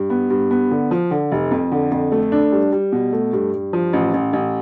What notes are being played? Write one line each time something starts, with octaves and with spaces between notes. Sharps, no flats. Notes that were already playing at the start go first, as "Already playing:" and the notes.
Already playing: G2
B3
G2
B3
D3
F3
D3
F1
F2
D3
F2
A3
D4
G3
G3
B2
A3
G2
G2
F3
A1
A1
A1